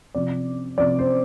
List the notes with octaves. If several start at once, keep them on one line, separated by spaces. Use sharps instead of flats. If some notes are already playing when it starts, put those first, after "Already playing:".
C3 F3 D5
C3 F3 D5
C5